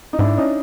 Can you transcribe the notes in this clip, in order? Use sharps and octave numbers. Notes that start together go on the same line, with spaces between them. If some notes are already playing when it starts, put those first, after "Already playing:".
D#4
G#2 D4 E4
C#4 D#4